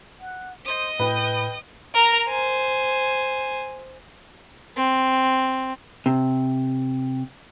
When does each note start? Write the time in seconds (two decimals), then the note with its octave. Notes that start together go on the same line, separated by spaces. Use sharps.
0.21 F#5
0.66 C5 D#5 D#6
0.99 A2 B4 G5
1.94 A#4 A#5
2.28 C5 G#5
4.77 C4
6.06 C3